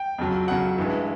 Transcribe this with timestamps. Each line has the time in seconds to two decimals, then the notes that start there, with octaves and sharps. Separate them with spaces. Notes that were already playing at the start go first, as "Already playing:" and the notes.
Already playing: G5
0.18 F2 C#3 F#3
0.48 F2 C#3 F#3 F#5
0.78 G2 E3 G#3